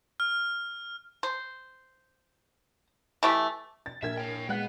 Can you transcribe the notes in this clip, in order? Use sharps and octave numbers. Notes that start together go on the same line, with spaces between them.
F6
C5
E3 A3 G4
A6
A#1 A#2 A#4 E5 G#6
C#5 G5
G#3 B3 F5 F#5 F#6